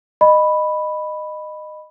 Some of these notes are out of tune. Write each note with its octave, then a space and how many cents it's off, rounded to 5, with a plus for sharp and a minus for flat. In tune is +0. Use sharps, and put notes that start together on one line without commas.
D#5 -20 B5 +0